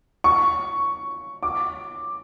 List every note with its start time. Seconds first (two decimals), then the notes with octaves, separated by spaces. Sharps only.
0.24 C#6
1.43 D6